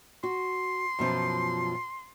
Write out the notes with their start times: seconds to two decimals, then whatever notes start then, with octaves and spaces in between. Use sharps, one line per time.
0.23 F#4 C6
0.99 F#2 B2 F3